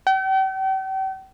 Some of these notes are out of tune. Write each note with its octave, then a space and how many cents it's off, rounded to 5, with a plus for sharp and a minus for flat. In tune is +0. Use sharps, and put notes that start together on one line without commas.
G5 -40